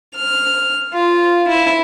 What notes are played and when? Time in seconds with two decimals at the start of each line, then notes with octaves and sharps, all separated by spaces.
0.15 F6
0.93 F4
1.48 E4